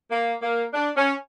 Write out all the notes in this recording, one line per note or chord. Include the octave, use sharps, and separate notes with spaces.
A#3
A#3
D4
C#4